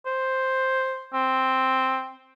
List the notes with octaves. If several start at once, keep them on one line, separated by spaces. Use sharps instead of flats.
C5
C4